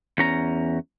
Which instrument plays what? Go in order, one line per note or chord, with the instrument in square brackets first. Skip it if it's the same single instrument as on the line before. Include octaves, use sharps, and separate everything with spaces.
[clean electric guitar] E2 C#4 A#5